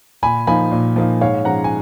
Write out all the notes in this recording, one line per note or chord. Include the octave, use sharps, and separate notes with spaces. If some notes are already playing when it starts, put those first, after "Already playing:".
A#2 G#5 B5
F3 A#3 D#4 G#5 B5
A#2
F3 A#3 D#4
G#2 C#5 F5
F3 G#3 C#4 F#5 A#5
G#5